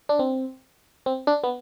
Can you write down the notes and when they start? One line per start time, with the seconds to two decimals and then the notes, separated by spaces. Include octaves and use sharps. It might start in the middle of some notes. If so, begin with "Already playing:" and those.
0.09 D4
0.19 C4
1.06 C4
1.27 D4
1.44 B3